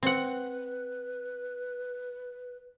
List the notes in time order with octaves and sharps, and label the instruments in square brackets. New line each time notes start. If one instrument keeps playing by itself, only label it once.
[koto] C4 F#5 [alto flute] B4